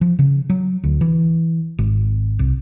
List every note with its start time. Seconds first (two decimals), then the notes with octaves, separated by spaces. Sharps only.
0.01 F3
0.19 C#3
0.50 F#3
0.84 D2
1.01 E3
1.79 G#1
2.39 C2